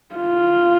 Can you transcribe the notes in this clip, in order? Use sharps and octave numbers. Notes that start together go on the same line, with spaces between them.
F4